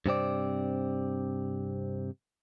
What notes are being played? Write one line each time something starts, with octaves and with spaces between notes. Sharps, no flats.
G2 C3 C4 D5